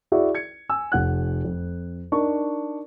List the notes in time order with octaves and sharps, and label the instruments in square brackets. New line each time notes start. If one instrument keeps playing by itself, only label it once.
[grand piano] E4 F#4 G#4 D5 E5
G#6 C#7
G#5 E6
F1 F#5 F#6
F2
D4 D#4 A#4 C#6